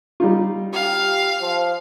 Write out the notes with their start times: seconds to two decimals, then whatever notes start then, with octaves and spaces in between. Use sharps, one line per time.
0.20 G3 D#4 F4
0.74 G4 F5
1.41 F3